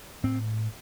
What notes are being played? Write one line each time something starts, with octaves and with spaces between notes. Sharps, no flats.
A2 C4